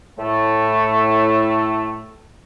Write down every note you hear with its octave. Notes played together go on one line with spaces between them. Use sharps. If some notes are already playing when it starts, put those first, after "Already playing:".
A2 A3